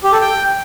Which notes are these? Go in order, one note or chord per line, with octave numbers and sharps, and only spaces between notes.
G4
A4
G5